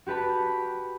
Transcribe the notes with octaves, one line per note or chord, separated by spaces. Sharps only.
F#4 G4 B4 A5 B5